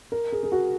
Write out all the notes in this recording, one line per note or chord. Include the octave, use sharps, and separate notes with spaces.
A#4
G#4
G#4
F#4